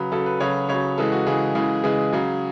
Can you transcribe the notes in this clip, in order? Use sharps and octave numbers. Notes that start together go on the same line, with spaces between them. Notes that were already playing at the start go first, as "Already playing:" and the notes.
Already playing: C#3 F#3 B4
C#3 F#3 A4
B4
C#3 F#3 C#5
C#3 F#3 C#5
C#3 E3 G#3 A4
F#4
C#3 E3 G#3 G#4
C#3 E3 G#3
C#3 E3 G#3 G#4
C#3 F#3